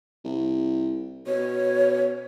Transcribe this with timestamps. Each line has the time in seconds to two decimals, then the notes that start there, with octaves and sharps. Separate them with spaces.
0.24 C2
1.26 B2 C#5